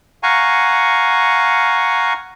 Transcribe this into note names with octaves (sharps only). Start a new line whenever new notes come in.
F5 F#5 G#5 A#5 C#6